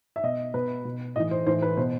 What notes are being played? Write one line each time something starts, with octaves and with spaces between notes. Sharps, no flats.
E5
B2 D#5
B2 B4
B2
A2 E3 D#5
C5
A2 E3 C5
B4
B2 C5